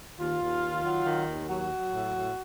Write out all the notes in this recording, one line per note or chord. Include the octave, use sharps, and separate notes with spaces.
D#2 F4
D#2
D#3
F#3
D#3
D#2
F#3 F#4
F#3
A2
A2